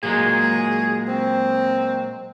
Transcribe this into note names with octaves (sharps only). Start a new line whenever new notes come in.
A#2 F#3 G#3 G#4
C4